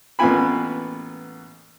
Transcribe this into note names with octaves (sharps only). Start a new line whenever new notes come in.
A1 A#3 B3 F4 G#5 B5